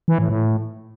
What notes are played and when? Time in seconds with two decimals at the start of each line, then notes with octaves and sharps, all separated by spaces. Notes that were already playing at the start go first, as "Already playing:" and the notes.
0.08 E3
0.19 A2
0.29 A2